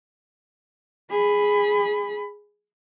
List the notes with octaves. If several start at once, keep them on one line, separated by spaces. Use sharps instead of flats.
G#4 B5